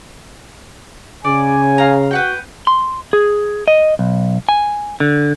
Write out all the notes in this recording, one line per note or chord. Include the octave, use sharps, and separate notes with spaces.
C#3 D5 G#5
F5 A#5
F#4 B4 F#5 G5
C6
G#4
D#5
B1
G#5
D3